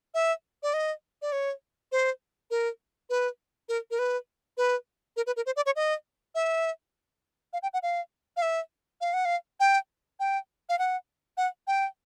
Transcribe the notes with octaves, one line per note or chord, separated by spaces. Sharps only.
E5
D5
D#5
D5
C#5
C5
A#4
B4
A#4
A#4
B4
B4
A#4
B4
A#4
C5
D5
C#5
D#5
E5
F5
G5
F#5
F5
F5
E5
F5
F#5
F5
G5
G5
F5
F#5
F#5
G5